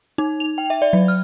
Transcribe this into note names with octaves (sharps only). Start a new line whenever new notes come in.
D#4
F7
G5
E5
D5
F#3
F6